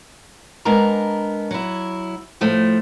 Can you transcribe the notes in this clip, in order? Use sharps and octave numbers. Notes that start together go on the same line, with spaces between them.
G#3 B3 D4 A#4 A#5
F#3 E4
A2 F3 A3